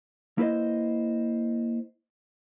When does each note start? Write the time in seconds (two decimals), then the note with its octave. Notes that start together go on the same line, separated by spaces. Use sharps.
0.38 A#3 E4 B4 C5 D#5